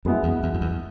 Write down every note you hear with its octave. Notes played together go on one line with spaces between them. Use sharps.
F#2 B2 G#3 B3 E4
E2
E2
F#2
E2